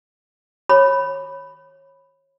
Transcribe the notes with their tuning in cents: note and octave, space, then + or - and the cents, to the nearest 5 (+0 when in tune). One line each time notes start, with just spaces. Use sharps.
C#5 -25 B5 +0